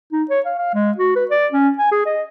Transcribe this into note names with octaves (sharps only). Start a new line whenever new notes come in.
D#4
C#5
F5
F5
G#3
F#4
B4
D5
C#4
G#5
G#4
D#5